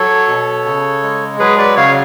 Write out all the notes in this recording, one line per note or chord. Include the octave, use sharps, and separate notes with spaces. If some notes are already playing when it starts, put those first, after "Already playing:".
Already playing: F#3 A4 C#5
B2
C#3
G#3
F#3 G#4 B4
B4 D5
C#3 C#5 F5